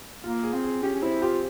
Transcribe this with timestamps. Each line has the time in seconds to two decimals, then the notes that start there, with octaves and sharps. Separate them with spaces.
0.24 A#3 F4
0.43 G#4
0.53 C4
0.64 G#4
0.83 C#4 G4
0.94 C#4
1.02 C4 E4
1.22 F4 G4